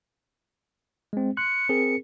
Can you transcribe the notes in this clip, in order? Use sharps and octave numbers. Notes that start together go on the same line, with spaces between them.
G#3 C4
C6 F#6 C#7
C4 G#4 A#4